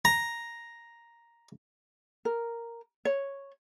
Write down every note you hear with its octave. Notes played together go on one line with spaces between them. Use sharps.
A#5
A#4
C#5